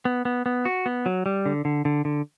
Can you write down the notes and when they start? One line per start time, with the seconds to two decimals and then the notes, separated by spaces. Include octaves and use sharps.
0.05 B3
0.25 B3
0.46 B3
0.65 F#4
0.86 B3
1.06 F#3
1.26 G3
1.46 D3
1.65 D3
1.85 D3
2.05 D3